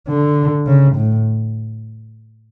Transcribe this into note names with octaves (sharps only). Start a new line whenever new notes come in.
D3
C#3
A2